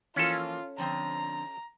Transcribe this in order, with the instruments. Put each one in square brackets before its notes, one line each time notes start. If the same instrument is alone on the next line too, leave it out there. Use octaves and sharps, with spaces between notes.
[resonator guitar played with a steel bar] E3 F3 A#3 [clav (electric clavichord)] C#4 A4 [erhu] F4
[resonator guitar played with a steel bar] D3 F3 C4 [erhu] A#5